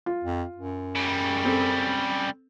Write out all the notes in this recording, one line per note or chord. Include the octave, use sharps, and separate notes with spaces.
F4
F2
F#2
C#3 G3
C4 A4